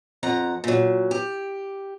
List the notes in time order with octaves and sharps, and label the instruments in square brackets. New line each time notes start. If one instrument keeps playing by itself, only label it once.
[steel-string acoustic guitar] F2 F#5 A#5
A#2 F#3
G4